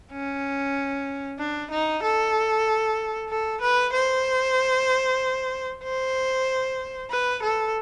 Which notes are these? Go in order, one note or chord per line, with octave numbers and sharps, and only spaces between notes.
C#4
D4
D#4
A4
A4
B4
C5
C5
B4
A4